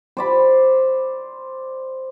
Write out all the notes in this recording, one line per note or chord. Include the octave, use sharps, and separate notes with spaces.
C5 D5 B5